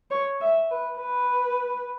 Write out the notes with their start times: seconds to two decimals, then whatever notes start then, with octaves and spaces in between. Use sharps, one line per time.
0.11 C#5
0.41 E5
0.71 B4
1.00 B4